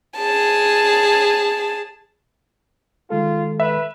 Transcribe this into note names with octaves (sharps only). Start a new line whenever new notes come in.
G#4 A5
D#3 G#3 F4 A4
B4 E5